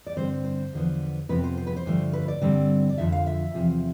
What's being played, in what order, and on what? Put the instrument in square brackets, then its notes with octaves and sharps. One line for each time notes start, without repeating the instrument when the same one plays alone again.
[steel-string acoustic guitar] D5
G2 D3 G3 C4 C5
C5
E2 D3 F3 B3
F2 C3 F3 B3 B4
C5
C5
B4
C5
G2 D3 F3 A3
B4
D5
G2 D3 G3 C4
D5
F2 D3 F3 E5
F5
E5
E2 C3 F3